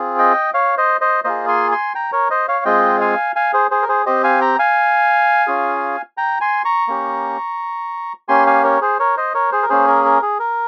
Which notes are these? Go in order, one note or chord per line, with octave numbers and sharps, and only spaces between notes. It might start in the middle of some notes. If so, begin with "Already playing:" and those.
Already playing: C4 F4 G#4
D#5 G5
C#5 F5
C5 D#5
C5 D#5
A#3 F4 G#4 C5 D#5
G#5 C6
G#5 C6
G5 A#5
A#4 C#5
C5 D#5
C#5 F5
G#3 C4 F4 G#4 D#5 G5
F5 G#5
F5 G#5
G#4 C5
G#4 C5
A#4
G#4 C5
C4 G4 C5 D#5
F5 G#5
G5 A#5
F5 G#5
C#4 F4 G#4
G5 A#5
G#5 C6
A#5 C#6
A#3 C#4 G4
A#3 C#4 G4 G#5 C6
F5 G#5
A#4 C#5
G#4 C5
A#4 C#5
C5 D#5
A#4 C#5
G#4 C5
A#4
A#3 C#4 G#4 C5
A#4
A#4
G#4
A#4